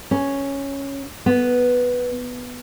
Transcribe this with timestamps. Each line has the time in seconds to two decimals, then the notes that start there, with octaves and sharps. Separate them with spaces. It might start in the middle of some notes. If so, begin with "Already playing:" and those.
0.11 C#4
1.26 B3